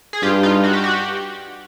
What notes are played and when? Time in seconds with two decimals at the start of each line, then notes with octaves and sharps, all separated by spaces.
0.13 G#4
0.22 G2 F4 G4
0.43 D#4 F4
0.64 F#4
0.73 G4
0.84 F#4
0.93 G4